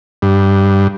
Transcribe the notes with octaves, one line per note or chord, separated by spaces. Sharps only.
G2